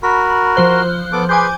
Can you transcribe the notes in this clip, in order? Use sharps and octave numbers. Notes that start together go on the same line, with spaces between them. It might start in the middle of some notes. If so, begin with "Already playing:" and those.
F#4 A#4 B5
F3 C5 F#6
B3 A4 D6
G#4 B4 G#5 C6 D6 G6